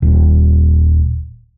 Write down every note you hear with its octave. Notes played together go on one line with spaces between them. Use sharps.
D#1